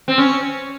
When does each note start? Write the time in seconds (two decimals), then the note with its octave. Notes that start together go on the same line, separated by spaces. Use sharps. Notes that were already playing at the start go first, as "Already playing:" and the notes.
0.08 C4
0.18 C#4